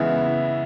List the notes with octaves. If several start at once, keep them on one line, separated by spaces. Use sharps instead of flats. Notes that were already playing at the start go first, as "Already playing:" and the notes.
Already playing: C#3 E3 G#3 B3 E4